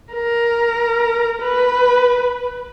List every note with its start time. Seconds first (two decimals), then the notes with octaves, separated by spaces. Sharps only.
0.14 A#4
1.41 B4